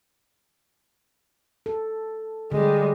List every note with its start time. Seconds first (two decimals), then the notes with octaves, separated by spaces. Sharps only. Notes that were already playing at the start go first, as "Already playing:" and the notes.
1.66 A4
2.52 D3 G3 G#3